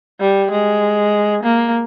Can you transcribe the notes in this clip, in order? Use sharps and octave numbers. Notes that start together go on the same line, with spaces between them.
G3
G#3
A#3